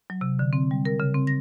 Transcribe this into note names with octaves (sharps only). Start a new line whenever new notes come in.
F#3
C3
D3
C4
G3
A#4
C#3
C4
A#6